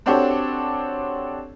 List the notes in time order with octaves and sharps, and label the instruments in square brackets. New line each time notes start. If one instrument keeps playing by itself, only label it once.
[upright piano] C4 D4 F#4 G4 A4 C#5